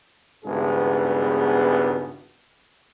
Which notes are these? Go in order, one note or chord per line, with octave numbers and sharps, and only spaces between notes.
G#1 C#2 G2 B2 B3 G#4